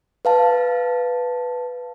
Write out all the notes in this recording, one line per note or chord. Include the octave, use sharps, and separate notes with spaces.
B4 F5 A5